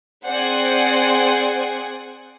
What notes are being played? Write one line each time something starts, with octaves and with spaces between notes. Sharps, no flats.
C4 G#4 C5 D5 F#5 G#5